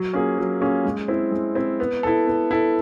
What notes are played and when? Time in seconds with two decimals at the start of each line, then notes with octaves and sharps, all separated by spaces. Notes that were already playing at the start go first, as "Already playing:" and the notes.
Already playing: F#3
0.13 A#3 C#4 F4 G#4
0.38 F#3
0.61 A#3 C#4 F4 G#4
0.85 G#3
1.08 C4 E4
1.32 G#3
1.55 C4 E4
1.80 B3
2.03 E4 A4
2.27 B3
2.51 E4 A4